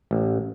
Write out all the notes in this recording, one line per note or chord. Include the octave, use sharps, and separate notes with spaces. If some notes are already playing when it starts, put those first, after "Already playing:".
A1